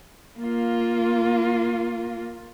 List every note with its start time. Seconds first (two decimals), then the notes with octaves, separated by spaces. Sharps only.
0.39 A#3 F4